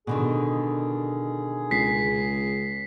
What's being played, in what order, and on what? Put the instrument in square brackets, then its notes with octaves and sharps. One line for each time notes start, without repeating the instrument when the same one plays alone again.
[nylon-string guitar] B2 D3 D#3 [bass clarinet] G#4
[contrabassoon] C#2 [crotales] B6 C7